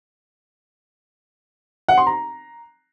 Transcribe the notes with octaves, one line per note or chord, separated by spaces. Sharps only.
F#5
C6
A#5